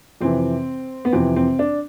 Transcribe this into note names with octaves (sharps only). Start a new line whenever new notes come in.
F2 C3 E3 C4
B3
F2 C3 E3 C4
C4
D4